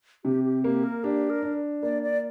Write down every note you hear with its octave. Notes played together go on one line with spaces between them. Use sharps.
C3 G4
G4
A#3 G4
A#4
D4 G4
A#4
D4
A#3 D5
D5